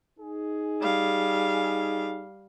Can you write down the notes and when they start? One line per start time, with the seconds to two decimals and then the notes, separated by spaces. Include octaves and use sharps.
0.19 D#4 G#4
0.82 G3 F5